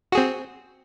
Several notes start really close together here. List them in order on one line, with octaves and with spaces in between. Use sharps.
F#4 G#4 C4